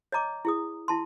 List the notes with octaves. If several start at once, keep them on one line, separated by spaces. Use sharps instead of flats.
C#5 D#5 A#5 D6
E4 G#4 D#6
E4 A5 C6